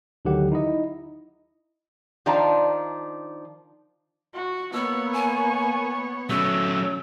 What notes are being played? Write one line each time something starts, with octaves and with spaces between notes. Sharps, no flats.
D2 D3 D#3 F#3 G4 F#5
D#4 E4 D#5
D#3 F3 D4 F5 A5 A#5
F#4
A#3 B3 C#5 E6
G#5
F#3 A3 C#4 E6